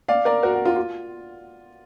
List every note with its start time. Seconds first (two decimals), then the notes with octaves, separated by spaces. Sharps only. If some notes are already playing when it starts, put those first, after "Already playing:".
0.08 D5 F5
0.25 A#4 D5
0.43 F#4 A#4
0.54 F#4
0.65 F4
0.76 F4